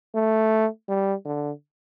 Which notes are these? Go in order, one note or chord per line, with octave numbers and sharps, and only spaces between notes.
A3
G3
D3